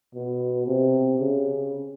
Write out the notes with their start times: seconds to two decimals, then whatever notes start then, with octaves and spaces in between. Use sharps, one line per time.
0.15 B2
0.67 C3
1.19 C#3